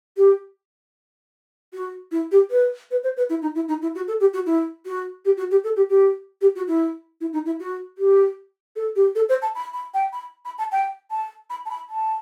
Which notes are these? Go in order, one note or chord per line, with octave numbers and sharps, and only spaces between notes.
G4
F#4
E4
G4
B4
B4
C5
B4
E4
D#4
E4
D#4
E4
F#4
A4
G4
F#4
E4
F#4
G4
F#4
G4
A4
G4
G4
G4
F#4
E4
E4
D#4
E4
F#4
G4
A4
G4
A4
C5
A5
B5
B5
G5
B5
B5
A5
G5
A5
B5
A5
B5
A5